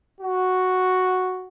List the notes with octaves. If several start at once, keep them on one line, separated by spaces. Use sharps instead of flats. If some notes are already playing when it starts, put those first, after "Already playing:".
F#4